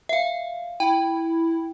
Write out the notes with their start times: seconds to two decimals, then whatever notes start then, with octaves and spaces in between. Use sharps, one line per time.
0.09 E5 F5
0.80 E4 G5